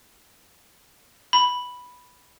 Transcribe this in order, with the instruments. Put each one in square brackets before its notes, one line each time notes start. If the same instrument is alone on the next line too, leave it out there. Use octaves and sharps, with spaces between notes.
[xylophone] B5